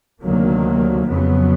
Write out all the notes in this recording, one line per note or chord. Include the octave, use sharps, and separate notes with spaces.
D2 C3 D#3 F#3 A#3
F2 C#3 F#3 B3